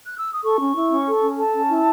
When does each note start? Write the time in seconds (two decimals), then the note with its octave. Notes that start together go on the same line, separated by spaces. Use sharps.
0.06 F#6
0.18 E6
0.31 D#6
0.43 A4 C#6
0.59 C#4
0.75 E4
0.90 C#4
1.06 A4
1.22 C#4
1.38 A4 A5
1.54 C#4
1.69 E4